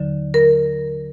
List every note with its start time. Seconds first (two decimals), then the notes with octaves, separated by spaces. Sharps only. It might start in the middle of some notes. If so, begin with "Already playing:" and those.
Already playing: D#2 D3 F#3
0.34 A#4